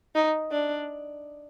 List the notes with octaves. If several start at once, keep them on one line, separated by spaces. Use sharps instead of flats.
D#4
D4